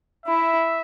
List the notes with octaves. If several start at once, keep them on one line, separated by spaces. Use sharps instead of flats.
E4 E5